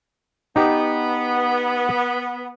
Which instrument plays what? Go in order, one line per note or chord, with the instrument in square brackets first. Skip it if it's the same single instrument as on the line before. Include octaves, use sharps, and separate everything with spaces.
[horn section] B3 [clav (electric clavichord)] D#4 G4